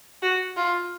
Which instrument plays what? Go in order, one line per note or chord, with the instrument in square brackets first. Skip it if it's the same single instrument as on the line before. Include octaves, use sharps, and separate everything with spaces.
[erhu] F#4
F4